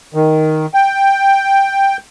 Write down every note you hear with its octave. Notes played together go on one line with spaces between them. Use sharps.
D#3
G5